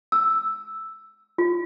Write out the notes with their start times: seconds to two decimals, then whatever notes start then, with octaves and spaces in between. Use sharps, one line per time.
0.12 E6
1.38 F4